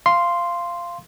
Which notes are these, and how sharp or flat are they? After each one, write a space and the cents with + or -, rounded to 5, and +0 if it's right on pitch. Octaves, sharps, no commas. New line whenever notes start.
F5 -15 C6 +0